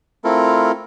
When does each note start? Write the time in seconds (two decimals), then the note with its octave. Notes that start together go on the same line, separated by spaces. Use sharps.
0.24 A3 C4 E4 F4 A4 A#4